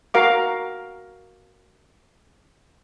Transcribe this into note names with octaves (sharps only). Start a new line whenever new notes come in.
F#4 A#4 F5 D6